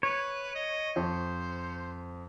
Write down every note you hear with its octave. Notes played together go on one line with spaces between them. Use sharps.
B4 C#5
D#5
F2 C5